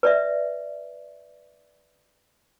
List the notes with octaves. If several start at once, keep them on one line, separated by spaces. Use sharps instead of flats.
B4 D5 E5